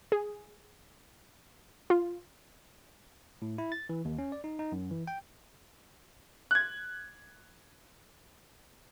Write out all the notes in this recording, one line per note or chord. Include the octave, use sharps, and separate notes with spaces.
G#4
F4
A2
E4
A6
E3
D#2
C#4
D5
D#4
D#4
F#2
E3
G5
F#6 G#6